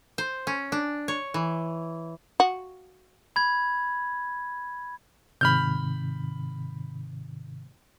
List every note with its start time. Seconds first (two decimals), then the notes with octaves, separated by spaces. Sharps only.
0.18 C5
0.47 C#4
0.72 D4
1.08 C#5
1.34 E3
2.40 F#4
3.36 B5 G#6
5.41 G#2 C3 D#3 B5 F6 G6